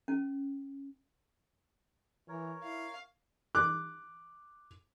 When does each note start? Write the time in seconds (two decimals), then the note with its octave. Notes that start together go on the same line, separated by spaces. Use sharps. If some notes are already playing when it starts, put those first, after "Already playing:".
0.08 C#4
2.28 E3 A#4 C#5
2.63 E4 F5
3.55 D6 F#6